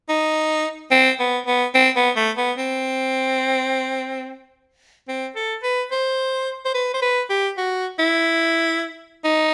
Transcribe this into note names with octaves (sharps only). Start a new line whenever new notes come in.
D#4
C4
B3
B3
C4
B3
A3
B3
C4
C4
A4
B4
C5
C5
B4
C5
B4
G4
F#4
E4
D#4